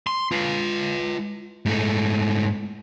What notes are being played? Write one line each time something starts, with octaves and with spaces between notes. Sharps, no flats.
C6
F4 B4
G#2 A3